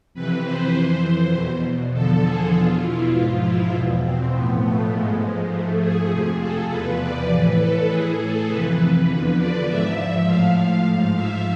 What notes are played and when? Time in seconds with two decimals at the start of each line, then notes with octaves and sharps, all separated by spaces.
0.14 F2 C3 E3 B4
0.44 C5
0.74 F2 E3
1.33 E2 B2
1.93 E2 D3 F3 A4
2.23 G#4
2.52 E2 B2 F4
2.82 E4
3.12 G#2 F3 F4
3.42 E4
3.71 E2 B2
4.02 C4
4.31 A2 F3 B3
4.61 A3
4.91 G#2 F3 G#3
5.50 G#2 F3 A3
5.81 G#4
6.10 F2 C3 F3 G#4
6.40 A4
6.70 E2 C3 F3 B4
7.00 D5
7.29 A2 E3 B4
7.59 A4
7.89 A2 E3 G#4
8.20 A4
8.48 F2 C3 E3 B4
8.78 B4
9.08 E2 D3 F3 B4
9.38 D5
9.68 G#2 F3 E5
10.27 A2 F3 F5
10.87 G#2 F3
11.16 E5